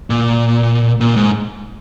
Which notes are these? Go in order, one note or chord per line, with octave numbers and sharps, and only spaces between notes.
A#2
A#2
G#2